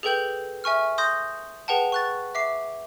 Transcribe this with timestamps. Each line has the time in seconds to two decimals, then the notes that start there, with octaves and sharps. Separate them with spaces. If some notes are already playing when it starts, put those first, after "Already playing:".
0.03 G#4 A4 B4 G5 G6 F#7
0.64 E5 G#5 C#6 F6
0.98 C6 D#6 G6 A#6
1.68 G#4 B4 F#5 G5 A5
1.92 C#6 F#6 A6
2.35 E5 D6 C7